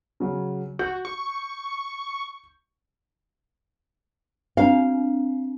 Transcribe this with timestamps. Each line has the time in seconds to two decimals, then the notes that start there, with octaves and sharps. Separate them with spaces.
0.20 C#3 F#3
0.79 F#4 G6
1.05 C#6
4.57 C4 D4 F5